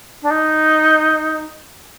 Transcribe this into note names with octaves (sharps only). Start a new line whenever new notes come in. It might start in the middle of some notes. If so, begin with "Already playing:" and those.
D4
D#4